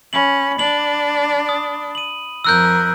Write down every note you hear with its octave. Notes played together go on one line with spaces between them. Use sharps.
C#4 B5 F#7
D4 F#7
D#6
D#7 F#7
F2 A#4 E6 F#6 G6